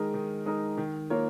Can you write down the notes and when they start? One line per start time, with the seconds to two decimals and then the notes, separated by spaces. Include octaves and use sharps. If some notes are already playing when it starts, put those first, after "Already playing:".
Already playing: D#3 G#3 D#4 A#4
0.14 D#3
0.45 G#3 D#4 A#4
0.77 D#3
1.10 A#3 F4 A#4 C#5